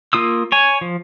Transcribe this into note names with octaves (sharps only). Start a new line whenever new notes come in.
A#3 F4 D#6 E6
C#5 G#5
F3